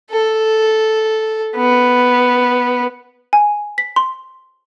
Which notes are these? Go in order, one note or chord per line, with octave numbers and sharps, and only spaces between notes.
A4
B3
G#5
B6
C6